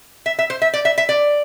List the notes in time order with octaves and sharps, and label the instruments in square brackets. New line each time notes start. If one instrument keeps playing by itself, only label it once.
[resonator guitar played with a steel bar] E5
E5
C5
E5
D5
E5
E5
D5